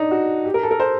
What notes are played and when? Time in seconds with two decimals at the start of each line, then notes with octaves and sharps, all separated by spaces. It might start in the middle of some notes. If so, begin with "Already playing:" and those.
Already playing: D4 D#4
0.11 F#4
0.45 G4
0.54 A#4
0.63 A4
0.71 A#4
0.80 C5